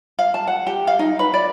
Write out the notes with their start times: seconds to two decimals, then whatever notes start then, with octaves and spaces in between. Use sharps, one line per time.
0.19 F5
0.34 A5
0.47 F#5
0.67 G4
0.87 F5
0.99 D#4
1.19 B4
1.34 D5